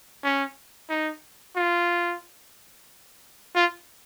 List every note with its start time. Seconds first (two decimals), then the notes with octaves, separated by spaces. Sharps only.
0.24 C#4
0.89 D#4
1.56 F4
3.55 F4